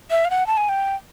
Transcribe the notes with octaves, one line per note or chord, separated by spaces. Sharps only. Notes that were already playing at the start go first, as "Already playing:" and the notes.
E5
F5
F#5
A5
G#5
G5